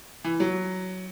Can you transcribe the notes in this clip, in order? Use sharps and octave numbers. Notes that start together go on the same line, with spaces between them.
E3
F#3